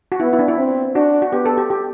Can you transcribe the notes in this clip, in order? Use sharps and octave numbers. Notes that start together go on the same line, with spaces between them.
F#4
B3 E4
E4
D4
E4
C4
D4 F#4
F#4
B3 G4
A4
G4
G4